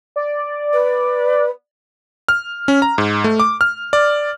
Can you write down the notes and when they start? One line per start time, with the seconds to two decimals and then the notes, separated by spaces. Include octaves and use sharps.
0.16 D5
0.73 B4
2.29 F6
2.68 C#4
2.82 A#5
2.98 G#2
3.24 A3
3.40 D6
3.61 F6
3.93 D5